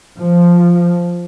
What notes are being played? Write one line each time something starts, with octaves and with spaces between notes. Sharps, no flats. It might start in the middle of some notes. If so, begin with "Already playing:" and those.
F3